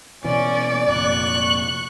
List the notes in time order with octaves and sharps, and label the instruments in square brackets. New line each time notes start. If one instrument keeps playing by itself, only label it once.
[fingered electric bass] B2 E3 [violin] C#4 [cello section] D5
[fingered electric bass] F1 A#2 [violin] C#6 F#6